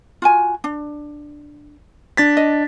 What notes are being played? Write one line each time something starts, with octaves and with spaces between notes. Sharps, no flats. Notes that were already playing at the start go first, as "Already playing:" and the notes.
F4 F#4 G#5
D4
D4 A6 B6
D#5